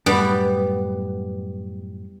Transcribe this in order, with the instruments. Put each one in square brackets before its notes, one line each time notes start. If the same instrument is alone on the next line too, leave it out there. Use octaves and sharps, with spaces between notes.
[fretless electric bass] F#2 A2 D4 [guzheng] G3 B3